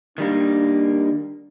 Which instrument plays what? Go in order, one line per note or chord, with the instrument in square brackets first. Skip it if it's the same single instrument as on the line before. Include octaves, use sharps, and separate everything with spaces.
[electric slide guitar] D#3 G3 A#3 [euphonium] D4